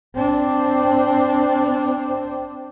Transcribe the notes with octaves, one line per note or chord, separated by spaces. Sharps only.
C4 D4